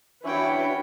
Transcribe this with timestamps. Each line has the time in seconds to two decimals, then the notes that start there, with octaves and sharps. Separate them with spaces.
0.24 E3 C#4 D4 E4 F#4 B4 C#5 G5